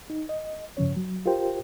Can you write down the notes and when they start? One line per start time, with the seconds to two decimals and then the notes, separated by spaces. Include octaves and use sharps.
0.10 D#4
0.29 D#5
0.77 G2 C#3 F3 C#4 C#5
0.96 F#3
1.26 F4 G4 A#4 C5 G5